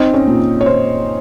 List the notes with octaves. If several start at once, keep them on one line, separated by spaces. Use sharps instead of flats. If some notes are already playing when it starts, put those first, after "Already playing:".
Already playing: C4 D#4 D#5
C#4 C#5
A#2
C#5
A#2 C5